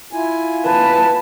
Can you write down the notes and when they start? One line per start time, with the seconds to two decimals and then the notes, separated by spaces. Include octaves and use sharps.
0.13 E4 F4 G#5
0.65 B4 A5